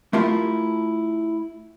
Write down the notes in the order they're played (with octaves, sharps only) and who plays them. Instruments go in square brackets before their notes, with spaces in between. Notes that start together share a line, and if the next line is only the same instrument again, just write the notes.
[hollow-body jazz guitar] A3 E4 F4 G4 A#4